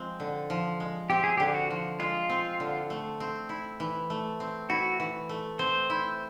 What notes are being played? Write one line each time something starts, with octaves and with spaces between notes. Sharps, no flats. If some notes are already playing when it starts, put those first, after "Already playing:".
Already playing: F3 G#3 C4
D3
F3
G#3
C4 G4
G#4
D3 G4
F#4
F3
G#3 F4
C4
D3
A3
C4
E4
E3
A3
C4
E4 F#4
E3
A3
C4 C5
E4